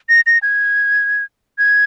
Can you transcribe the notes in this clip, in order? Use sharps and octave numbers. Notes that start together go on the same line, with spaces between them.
A#6
A#6
G#6
G#6